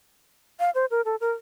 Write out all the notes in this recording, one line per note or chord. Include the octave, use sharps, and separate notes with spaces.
F5
C5
A#4
A4
A#4